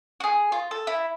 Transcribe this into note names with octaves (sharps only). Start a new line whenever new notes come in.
F#4 G#4
F4
A4
E4